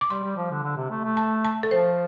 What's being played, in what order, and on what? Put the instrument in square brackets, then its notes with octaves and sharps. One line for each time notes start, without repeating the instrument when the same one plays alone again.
[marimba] D6
[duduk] G3 [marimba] C6
[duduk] G3
F3
D3
D3
C3
A3
A3
[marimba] A5
A5
A4
[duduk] F3 [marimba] C5